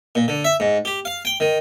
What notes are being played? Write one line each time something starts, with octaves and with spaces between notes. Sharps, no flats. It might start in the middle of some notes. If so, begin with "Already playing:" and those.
A#2
D3
E5
G#2
G4
F5
G5
D#3